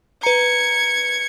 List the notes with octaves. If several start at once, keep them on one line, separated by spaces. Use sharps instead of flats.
B4 A#5 G#6 C#7